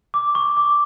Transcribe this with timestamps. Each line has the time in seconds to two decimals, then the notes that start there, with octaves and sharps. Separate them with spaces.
0.14 D6
0.35 C#6
0.57 D6